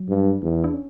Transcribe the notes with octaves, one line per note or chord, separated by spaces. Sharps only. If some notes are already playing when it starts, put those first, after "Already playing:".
Already playing: F#3
G2
E2
D4
C#4